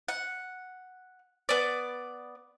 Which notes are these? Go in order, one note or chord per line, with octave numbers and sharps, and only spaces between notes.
F#5
B3 D5